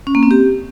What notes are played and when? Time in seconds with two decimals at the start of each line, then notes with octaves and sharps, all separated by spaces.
0.07 C#4
0.15 A#3
0.23 C4
0.31 G4